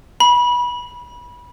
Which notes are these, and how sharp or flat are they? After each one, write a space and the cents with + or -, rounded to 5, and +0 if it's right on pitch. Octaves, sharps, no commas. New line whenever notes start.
B5 -25